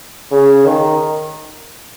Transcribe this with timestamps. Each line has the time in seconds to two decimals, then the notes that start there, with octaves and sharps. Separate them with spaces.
0.31 C#3
0.66 D#3